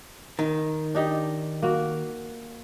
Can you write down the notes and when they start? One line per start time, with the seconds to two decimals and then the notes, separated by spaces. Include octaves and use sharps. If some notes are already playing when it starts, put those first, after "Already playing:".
0.39 D#3
0.95 D4 D#4 G4
1.63 A#3 F#4